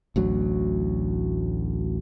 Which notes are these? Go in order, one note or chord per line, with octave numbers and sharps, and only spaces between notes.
A1 D2 F#3